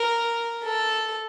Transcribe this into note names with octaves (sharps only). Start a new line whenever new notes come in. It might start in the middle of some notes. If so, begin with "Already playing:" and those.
Already playing: A#4
A4